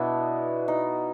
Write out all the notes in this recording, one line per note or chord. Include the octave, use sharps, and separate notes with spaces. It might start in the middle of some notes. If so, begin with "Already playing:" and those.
Already playing: B2 B3 D4 E4
D#4